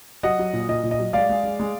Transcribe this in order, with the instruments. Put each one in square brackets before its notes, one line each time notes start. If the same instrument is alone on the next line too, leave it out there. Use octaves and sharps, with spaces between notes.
[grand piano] F#3 D#5 F#5
F#3
A#2
A#2 D#5
A#2
D#5
F#3
G#3 D5 F5
G#3
G#3
G#3